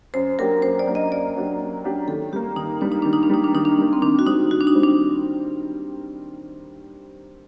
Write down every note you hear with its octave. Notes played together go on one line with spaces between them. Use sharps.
F#2 C5
F#3 A#3 D4 G4 A#4
F#2 C5
D5
F#3 A#3 D4 G4
D#5
F#2 D5
F#3 A#3 D4 G4
F#2
F#3 A#3 D4 G4
D#3 A4
G3 A#3 G4
D#3 D#4
G3 A#3 D4
D#4
D#3 D4
D#4
D4
G3 A#3 D#4
D4
D#3 D#4
D4
G3 A#3
C4
D#3 D4
F#4
G3 C4 D#4
D#3 F#4
D4
D#4
G3 C4
D4